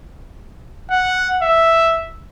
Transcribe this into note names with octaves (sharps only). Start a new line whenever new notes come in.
F#5
E5